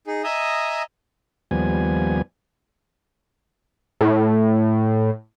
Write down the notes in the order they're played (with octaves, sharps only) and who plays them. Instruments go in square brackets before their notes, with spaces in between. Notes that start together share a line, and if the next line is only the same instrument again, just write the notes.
[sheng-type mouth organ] D#4 G#4
D#5 E5 G#5 A#5 D#6
[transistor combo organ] D#2 F3 G3 B3 G#5
[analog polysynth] A2